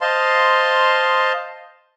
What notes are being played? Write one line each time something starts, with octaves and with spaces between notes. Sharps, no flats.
C5 D#5 F5 A5 C6